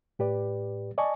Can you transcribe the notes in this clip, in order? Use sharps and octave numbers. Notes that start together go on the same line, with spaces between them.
A2 G4 B4 D5
D5 D#5 G#5 A5 C#6